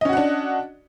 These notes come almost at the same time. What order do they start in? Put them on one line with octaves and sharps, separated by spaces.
D#5 C#4 F#4 F#5 D4